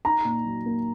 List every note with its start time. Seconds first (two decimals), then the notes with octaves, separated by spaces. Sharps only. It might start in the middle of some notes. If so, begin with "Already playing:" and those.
0.05 D#4 A#5
0.25 A#2
0.45 F#3
0.66 A#3